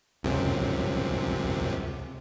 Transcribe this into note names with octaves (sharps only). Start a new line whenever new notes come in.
C#2 F#2 C3